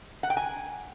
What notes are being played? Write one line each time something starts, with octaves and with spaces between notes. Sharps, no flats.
F#5
G5
G#5